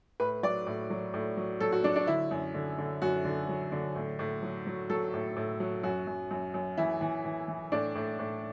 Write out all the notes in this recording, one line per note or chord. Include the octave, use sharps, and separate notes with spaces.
A2 B4
F#3 D5
A2
F#3
A2
F#3
F#3 A4
F#4
F#3 D4
D4
D3 E4
F#2
D3
D3
F#2 F#4
D3
F#3
D3
A2
A2
F#3
F#3
F#3 A4
A2
A2
F#3
F#2 F#4
F#2
F#2
F#2
E3 E4
E3
E3
E3
A2 D4
A2
A2